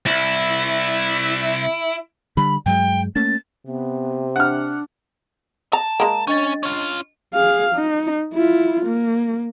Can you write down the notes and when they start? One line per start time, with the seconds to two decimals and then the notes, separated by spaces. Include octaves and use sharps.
0.06 C2 E4
2.37 D3 G3 B5
2.66 G2 F#3 G#3 G5
3.16 A3 A#3 C#4 A6
3.67 C3 B3
4.36 D4 F#5 F6
5.73 A5 A#5
6.00 G#3 A#3 A#5
6.27 C#4 D4 D#5 A6
6.63 C#4 F4
7.34 G#4 F5
7.75 D#4
8.33 E4 F4
8.86 A#3